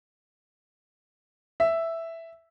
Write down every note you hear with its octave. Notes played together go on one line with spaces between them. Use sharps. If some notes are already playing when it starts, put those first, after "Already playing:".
E5